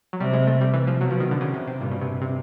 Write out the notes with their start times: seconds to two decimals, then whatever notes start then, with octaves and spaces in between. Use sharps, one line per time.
0.13 F#3
0.20 C3 G3
0.33 G#3
0.47 A3
0.61 G3
0.74 E3
0.87 F3
1.01 B2 F#3
1.11 F3
1.20 D#3
1.31 D3
1.41 C#3
1.54 C3
1.68 C3
1.80 G2 A#2
1.92 B2
2.02 C3
2.22 C3